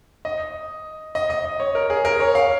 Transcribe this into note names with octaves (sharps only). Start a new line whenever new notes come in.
D#5
D#5
D#5
D#5
C#5
A#4
G#4
A#4
C#5
F5